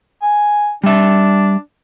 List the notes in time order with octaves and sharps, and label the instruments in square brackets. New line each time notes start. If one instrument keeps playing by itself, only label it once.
[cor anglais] G#5
[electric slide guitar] G3 E5 [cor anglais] D4